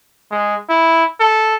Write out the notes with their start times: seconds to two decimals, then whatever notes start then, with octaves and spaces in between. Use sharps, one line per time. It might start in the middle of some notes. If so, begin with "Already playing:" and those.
0.31 G#3
0.69 E4
1.20 A4